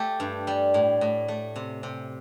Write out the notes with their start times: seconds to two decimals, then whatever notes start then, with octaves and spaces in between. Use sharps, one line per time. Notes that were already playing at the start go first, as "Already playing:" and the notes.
Already playing: A3 G4 A4
0.20 G2
0.47 G3
0.74 A2
1.01 A2
1.28 A3
1.56 C3
1.83 C3